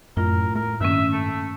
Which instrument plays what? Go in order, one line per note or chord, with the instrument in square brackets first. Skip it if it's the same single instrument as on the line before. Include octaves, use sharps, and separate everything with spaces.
[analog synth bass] F#2 [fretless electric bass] A2 [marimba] F4 [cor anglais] A#4
[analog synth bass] A3 [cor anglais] A#4
[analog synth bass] G2 [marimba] D#3 A#3 C#4 [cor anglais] E5
[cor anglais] A3